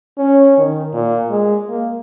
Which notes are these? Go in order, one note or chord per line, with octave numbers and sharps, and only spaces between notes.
C#4
D#3
A#2
G#3
A#3